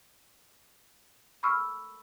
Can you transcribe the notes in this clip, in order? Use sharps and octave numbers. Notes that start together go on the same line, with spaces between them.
B5 C#6 E6 F6